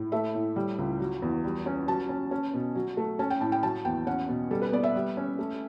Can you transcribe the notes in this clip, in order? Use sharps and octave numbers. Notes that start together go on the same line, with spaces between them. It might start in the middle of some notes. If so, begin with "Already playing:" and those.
Already playing: A2
A3 E5
A2
G3
C#2
F#3
E2
G3
C#4
F#3 A5
C#4
C#4
B2
F#3
A3
C#4 A5
G5
A2 A5
G5
F#3 A5
E2 G5
C#4 F#5
B2
G3 A4
B4
B3 D5
E5
G3
C#4
A3